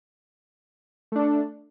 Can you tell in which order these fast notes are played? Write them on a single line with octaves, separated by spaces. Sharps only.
A3 D4 A4